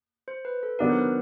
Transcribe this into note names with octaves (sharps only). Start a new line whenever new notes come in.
C5
B4
A4
D#3 F#3 B3 D4 A#4
C5
B4